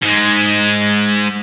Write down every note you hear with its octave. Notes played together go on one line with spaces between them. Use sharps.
G#2 G#3